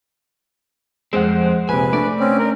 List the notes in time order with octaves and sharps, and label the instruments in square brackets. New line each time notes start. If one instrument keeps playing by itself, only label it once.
[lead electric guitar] F2 C4 [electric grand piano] G#3 C5 F#5
[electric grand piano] A#1 C3 [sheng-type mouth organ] B4 [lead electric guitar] G#5
[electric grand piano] A3 D4 [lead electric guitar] D5
[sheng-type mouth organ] C4 C#4
A#4